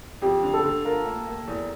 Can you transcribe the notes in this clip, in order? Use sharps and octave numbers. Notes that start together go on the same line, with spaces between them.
F2 G4
D3
A4
D3
F4 A#4
A#3
A#3
E2